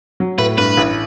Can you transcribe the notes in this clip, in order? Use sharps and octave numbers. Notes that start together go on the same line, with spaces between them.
F#3
A2 B4
G2 B4
A1